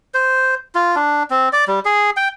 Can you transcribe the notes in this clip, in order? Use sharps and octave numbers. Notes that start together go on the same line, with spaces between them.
C5
F4
D4
C4
D5
G3
G#4
G5